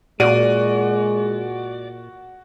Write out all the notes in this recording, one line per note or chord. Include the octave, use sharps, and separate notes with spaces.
A#2 G#3 F#4 D5 D#7